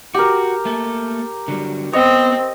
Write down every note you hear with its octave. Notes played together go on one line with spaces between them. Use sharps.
F#4 G4 A#4
A3 A#3 A4
D3 F#3 G3
B3 C4 C#5 D#5